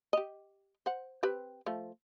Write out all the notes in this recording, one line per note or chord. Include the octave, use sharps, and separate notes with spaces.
G4 D#5
C5 F#5
C4 G4 B4
F3 A3